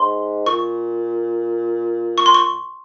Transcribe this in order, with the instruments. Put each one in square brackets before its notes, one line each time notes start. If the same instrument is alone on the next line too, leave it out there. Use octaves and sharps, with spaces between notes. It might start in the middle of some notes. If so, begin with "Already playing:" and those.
Already playing: [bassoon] G#2 [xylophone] C6
[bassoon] A#2 [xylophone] C#6
[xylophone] C#6
C6
C#6